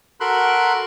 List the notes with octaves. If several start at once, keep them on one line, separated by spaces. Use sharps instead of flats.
F#4 A4 A#4 B5 C6 F#6